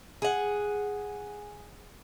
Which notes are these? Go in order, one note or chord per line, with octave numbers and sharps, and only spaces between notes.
G#4 F#5